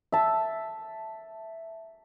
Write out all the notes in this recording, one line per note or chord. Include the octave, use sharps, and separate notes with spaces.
E5 A5